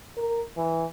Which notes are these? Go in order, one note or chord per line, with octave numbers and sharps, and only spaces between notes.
A#4
E3